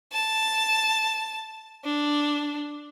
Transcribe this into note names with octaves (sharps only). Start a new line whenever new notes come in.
A5
D4